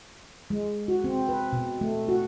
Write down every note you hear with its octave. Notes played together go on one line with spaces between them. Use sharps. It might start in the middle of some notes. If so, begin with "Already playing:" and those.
G#3
F#4
C4
B4
B2
A3
F#4